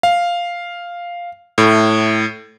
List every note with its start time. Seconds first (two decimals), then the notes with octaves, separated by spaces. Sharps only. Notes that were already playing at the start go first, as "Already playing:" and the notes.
0.03 F5
1.58 A2